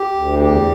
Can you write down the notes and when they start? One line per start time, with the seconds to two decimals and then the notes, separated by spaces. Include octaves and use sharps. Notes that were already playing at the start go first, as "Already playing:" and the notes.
Already playing: G4
0.14 D2
0.39 E2 G4